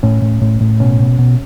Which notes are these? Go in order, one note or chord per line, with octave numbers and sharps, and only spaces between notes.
A2 C#4
A2
A2
A2
B2 C#4
B2
B2